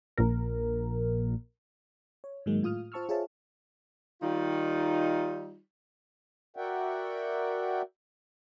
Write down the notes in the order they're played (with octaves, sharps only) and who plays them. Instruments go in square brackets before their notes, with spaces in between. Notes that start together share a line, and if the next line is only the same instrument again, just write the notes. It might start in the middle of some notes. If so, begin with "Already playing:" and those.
[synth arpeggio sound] A#1 A#2 A#4
[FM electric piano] C#5
G#2 D#3 F#3 G#3 A#3
A2 F4 D#6 F6
F4 C5 A5 C#6 E6 F6
F4 G#4 C5 C#5 E5 A5
[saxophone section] D#3 G3 D#4 F4
[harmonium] F#4 A#4 D5 E5 F#5 G5